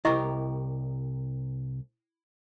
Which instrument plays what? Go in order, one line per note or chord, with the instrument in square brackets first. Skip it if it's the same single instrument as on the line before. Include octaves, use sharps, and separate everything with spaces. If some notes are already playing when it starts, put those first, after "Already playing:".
[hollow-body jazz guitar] C2 G4 A#4 [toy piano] E4 D#5 C#6